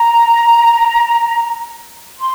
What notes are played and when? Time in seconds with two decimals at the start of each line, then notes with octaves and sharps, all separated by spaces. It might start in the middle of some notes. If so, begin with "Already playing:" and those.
Already playing: A#5
2.19 C6